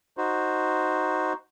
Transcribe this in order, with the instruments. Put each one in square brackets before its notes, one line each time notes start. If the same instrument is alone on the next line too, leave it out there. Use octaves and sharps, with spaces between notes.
[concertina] D#4 F#4 C5